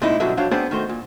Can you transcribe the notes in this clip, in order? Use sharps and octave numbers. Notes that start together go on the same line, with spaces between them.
A#2 G#3 C4 D#4 E4
F#2 B2 D3 F#3 G3 E5
F2 F#3 D4 C5 C#5 F5
B3 C4 D4 G#4 C5 D5
D#3 A3 F#4 C5
A#2